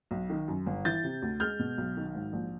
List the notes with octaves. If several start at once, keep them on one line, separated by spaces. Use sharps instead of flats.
B1
D#3
F#2
G1
E3 G6 A6
C3
D2
G#3 F6 G6
B2
B1
D#3
G#2
A#1